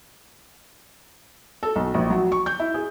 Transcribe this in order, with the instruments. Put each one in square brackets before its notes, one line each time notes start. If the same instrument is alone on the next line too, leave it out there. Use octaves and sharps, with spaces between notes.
[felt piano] A4
B1
A#1
F#3
C#6
G6
E4
G#4